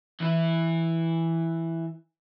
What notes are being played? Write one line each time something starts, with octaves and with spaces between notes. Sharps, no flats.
E3 E4